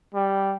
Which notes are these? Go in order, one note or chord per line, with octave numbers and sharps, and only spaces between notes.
G3